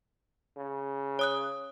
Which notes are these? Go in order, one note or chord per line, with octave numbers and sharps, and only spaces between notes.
C#3
C#5 D#6 F#6